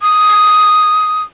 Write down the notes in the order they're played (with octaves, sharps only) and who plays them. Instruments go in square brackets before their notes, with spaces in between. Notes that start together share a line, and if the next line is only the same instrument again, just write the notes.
[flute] D#6